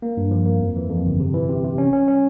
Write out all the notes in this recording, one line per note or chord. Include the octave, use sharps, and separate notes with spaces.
A#3
G2
F3
A#3
F2
E3
F2
G1
C3
E3
C3
C3
C#4
C#4
C#4